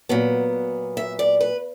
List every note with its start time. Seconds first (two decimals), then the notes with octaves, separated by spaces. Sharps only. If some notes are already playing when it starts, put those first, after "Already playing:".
0.09 A#2 F#3 B3
0.97 E5
1.19 D5
1.41 B4